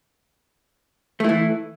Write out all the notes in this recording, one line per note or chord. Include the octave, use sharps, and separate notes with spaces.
E3 A3 E4